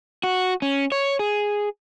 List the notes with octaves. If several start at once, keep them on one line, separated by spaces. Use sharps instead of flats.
F#4
C#4
C#5
G#4